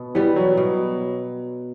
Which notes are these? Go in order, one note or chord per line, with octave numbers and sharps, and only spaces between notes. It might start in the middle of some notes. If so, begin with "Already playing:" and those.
Already playing: B2
E3 G3 B3
F#3
B2